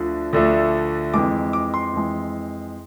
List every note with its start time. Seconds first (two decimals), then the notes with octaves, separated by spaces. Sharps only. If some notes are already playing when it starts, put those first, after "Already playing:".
Already playing: D2 D3 F3 A3
0.33 D2 D3 F3 A3
1.14 F2 E3 G#3 D6
1.53 D6
1.74 C6
1.93 F2 E3 G#3